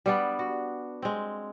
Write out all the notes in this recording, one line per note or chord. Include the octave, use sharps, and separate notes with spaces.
G3 B3 D4
F#4
G#3 C4